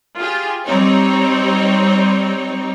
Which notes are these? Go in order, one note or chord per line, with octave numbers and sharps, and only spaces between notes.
F4 G4 G#4
G3 C4 D#4 C#5